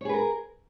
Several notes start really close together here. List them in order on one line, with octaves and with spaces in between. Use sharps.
C#5 G#4 B4 A#4